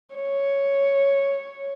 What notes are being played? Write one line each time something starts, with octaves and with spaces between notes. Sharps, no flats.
C#5